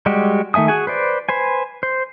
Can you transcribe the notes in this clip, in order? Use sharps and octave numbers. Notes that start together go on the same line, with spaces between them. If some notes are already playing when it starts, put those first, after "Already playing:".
G3 G#3 F#4 G4
D#3 A3 E5 G#5 D#6
F#4 G#4 G#5
B4 C5 D5
B4 C5 G#5
C5